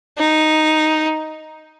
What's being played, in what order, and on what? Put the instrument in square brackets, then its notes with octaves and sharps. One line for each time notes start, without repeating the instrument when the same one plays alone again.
[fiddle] D#4